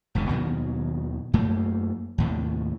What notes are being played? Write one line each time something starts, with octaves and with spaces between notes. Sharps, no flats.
E1 C#2 G2 C#3
D#2 B2 D#3 F#3
F#2 A3 A#3
D#2 A2 C3